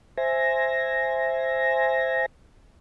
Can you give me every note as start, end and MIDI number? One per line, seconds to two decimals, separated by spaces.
0.17 2.26 72
0.17 2.26 76
0.17 2.26 80
0.17 2.26 94